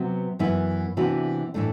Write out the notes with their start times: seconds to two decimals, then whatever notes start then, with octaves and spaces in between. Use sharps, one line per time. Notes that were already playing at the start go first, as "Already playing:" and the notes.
Already playing: C3 F#3 B3
0.39 F#2 E3 B3 E4
0.97 C3 E3 B3 D4 F#4
1.54 A2 E3 A3 D4